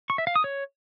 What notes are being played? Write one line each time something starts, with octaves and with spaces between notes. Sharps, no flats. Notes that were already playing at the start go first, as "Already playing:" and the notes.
C#6
E5
F5
D#6
C#5